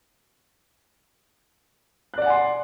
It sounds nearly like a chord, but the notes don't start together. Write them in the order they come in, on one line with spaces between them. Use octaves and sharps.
F#6 D5 F#5 G#5 C6